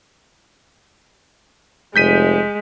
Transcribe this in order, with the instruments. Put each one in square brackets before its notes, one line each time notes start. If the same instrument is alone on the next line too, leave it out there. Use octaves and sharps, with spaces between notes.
[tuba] F1 [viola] G#3 [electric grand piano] G6 B6 D#7